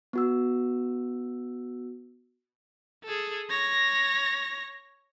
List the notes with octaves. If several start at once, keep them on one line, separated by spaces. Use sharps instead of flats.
B3 F#4 E6
G#4 A4
C#5 A#6